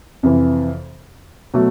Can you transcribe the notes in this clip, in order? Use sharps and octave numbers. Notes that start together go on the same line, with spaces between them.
F2 C3 E3
B2 F#3 A3